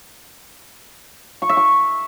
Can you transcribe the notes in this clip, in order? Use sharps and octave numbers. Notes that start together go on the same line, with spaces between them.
C#6
E5
C#6